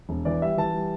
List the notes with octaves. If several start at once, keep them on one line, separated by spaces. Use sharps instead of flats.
E1
E3 D5
G3 E5
E3 A5
G3